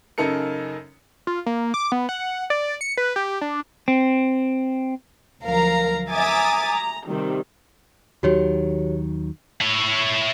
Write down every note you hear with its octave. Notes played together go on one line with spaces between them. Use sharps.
F#2 C#3 D#4 A4 A#4 C#7
F4
A#3
D6
B3
F#5
D5
C#7
B4
G4
D4
C4
D2 F3 F#3 A#4 F5 A#5
E5 G#5 A#5 D6 D#6 A6
A#5
C3 D#3 G3
D#2 D#3 F#3 F#4 G4 C#5
E4 C#5